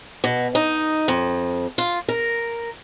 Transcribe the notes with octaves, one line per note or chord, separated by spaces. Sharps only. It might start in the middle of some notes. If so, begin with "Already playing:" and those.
B2
D#4
F2
F4
A#4